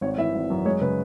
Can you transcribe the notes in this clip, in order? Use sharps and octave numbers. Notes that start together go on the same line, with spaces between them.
G#1 C#5
E3 E5
G#1
F#2
G#3 C#5
C#3 B4